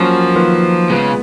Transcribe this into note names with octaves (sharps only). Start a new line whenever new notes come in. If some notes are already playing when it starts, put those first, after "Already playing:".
Already playing: F3 F#3 A#3 C#4 F#4 A#4
D#3 F#3 A#3 F4 B4
C#3 G#3 B3 F4 B4